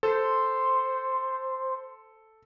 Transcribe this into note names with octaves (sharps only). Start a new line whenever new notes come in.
A4 C5